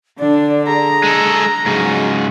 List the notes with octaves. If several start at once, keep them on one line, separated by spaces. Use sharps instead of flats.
D3 D4 D5
G#4 A#5
G#3 A4
G#2 C#3 F#3 G#4